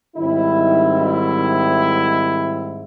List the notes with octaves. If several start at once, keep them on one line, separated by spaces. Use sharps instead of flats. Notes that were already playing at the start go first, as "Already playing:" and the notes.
G#2 D#3 G3 C4 E4
E4